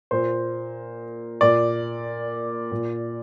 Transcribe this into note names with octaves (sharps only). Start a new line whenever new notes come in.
A#2 C5
A#2 D5
A#2